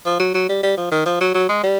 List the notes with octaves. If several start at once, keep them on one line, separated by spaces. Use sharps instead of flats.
F3
F#3
F#3
G3
G3
F3
D#3
F3
F#3
F#3
G#3
G3